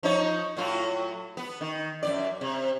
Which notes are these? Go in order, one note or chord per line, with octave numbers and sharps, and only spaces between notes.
F3 D#4 C#5
A2 F#3 F4
B3
D#3
F#2 A#2 D5
C3